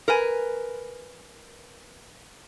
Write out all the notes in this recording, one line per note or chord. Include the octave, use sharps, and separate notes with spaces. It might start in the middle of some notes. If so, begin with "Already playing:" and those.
A#4 B4 G#5